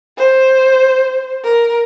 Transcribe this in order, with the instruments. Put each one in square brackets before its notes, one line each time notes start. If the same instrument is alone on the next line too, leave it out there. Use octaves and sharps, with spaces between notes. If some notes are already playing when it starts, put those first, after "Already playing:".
[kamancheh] C5
A#4